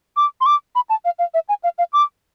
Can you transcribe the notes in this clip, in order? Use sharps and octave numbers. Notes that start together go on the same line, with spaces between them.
D6
C6
D6
B5
A5
F5
F5
E5
G#5
F5
F5
D6